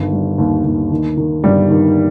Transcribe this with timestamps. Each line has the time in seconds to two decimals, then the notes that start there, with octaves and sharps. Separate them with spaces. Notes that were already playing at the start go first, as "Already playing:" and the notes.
Already playing: G1 D#3
0.12 G3
0.38 D#2
0.64 D#2
0.91 D#3
1.17 D#3
1.44 G1 G3
1.70 D#3